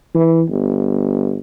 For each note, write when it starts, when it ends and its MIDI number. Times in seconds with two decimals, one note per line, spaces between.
0.14 0.43 52
0.50 1.39 31